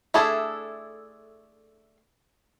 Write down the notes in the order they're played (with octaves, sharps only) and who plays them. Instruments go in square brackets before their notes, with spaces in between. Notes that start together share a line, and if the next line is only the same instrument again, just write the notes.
[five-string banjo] A3 D4 E4 G#4 A4